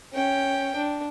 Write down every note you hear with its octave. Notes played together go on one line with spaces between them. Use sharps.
C#4 G5
D4